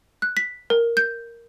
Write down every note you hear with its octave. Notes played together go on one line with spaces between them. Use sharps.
F#6
B6
A#4
G6